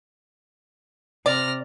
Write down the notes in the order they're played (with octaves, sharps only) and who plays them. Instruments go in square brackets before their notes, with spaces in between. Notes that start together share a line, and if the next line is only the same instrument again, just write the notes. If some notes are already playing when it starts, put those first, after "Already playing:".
[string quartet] C3 F6 A#6 [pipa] D5